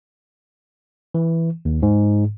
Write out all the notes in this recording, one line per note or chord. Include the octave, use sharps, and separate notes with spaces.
E3
D#2
G#2